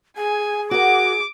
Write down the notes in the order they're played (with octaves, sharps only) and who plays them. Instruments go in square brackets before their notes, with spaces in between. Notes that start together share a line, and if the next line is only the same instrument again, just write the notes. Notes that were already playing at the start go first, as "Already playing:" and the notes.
[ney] G#4 [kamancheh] G#5
[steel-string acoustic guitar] F#4 A#4 [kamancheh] D6